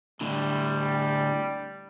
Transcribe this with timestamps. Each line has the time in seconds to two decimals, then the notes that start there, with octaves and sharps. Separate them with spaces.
0.21 A2 D3 G3